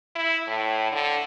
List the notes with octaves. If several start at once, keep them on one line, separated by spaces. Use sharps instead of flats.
E4
A2
D3